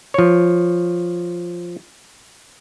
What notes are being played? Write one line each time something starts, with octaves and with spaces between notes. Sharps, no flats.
F3 C#5